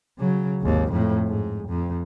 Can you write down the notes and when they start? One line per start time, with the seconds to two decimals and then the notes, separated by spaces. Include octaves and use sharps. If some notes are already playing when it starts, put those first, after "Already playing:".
0.18 C#3 F#3
0.61 G#1 D#2
0.92 F2 A2
1.27 G#2
1.68 F2